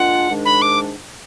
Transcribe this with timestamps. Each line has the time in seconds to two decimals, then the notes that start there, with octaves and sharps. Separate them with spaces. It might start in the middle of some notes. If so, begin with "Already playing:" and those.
Already playing: A#2 G#3 D4 F4 F#5
0.29 G#2 D#3 G#3 D4
0.45 B5
0.62 D6